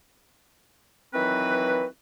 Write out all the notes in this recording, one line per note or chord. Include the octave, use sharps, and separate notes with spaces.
D#3 E3 F#3 C4 F#4 B4